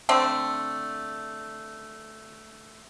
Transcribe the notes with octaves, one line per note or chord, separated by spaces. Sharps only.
D3 A3 C4